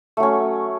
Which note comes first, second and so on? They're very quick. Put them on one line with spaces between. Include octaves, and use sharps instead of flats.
A3 F#3 C#4